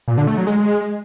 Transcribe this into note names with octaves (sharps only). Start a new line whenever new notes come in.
A#2
D3
A3
F#3
G#3